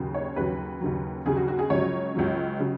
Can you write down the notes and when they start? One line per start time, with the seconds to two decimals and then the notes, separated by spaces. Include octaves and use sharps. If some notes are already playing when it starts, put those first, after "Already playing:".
Already playing: D#2 C#3 F#3
0.14 C#5
0.36 D#2 C#3 F#3 B4
0.81 D#2 C#3 F#3
1.26 D#2 C#3 F#3 G#4
1.37 F#4
1.48 F#4
1.59 G#4
1.70 C#2 C#3 F#3 C#5
2.15 C#2 C#3 F#3
2.59 C#3 F#3